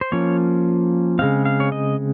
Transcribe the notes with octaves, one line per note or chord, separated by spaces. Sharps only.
C5
F3 A#3 C#4 C#5
C#3 G#3 C4 F5
F5
C#5
D#5